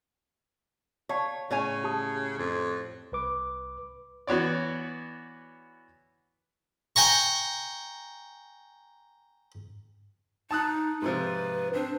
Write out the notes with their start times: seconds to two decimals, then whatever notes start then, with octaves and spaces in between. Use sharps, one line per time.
1.09 C#5 F5 G5 A5
1.51 A2 C#3 C#5 G#5
1.84 G4 A5 D#6
2.38 F2
3.12 C2 B4 D6
4.27 E3 B3 F#4 C#5 D5
6.96 G5 G#5 A#5 C#6
10.51 D#4 A5 D#6 F#6
11.02 G#2 C3 F3 B4
11.74 C4 D4